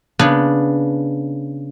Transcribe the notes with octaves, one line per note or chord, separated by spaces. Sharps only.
C#3 B3 D4